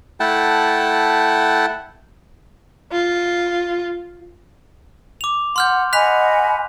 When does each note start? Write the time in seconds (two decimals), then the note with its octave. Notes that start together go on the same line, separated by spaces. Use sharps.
0.20 A3 E4 F#5 G5 A5
2.92 F4
5.21 D6 F7
5.56 F#5 C6 F6 G6
5.93 D#5 F#5 G#5 B5 F#6 B6 F7